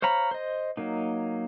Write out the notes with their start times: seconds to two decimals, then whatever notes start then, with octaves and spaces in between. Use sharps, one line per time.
0.02 C5 C#5 F5 A#5 B5
0.31 C5 D#5
0.77 F#3 A#3 D#4